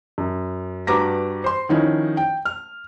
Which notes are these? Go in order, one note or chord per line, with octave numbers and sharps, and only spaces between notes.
F#2
G2 F#4 B4 A#5 D6 A#6
C5 C6
D#3 F3 C#4 D#4 E4
G5
F6